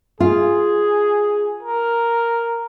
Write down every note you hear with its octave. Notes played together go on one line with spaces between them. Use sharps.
F4 G#4
A#4